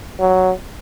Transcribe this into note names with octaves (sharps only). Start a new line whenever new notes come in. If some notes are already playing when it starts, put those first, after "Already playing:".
F#3